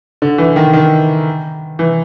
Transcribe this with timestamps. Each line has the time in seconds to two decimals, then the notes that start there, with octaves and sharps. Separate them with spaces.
0.22 D3
0.38 E3
0.56 D#3
0.73 D#3
1.79 E3